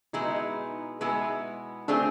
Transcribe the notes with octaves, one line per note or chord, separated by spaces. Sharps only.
B2 G#3 B3 D#4 E4 G#4
B2 G#3 B3 E4 G#4
A3 C4 D4 F4 G#4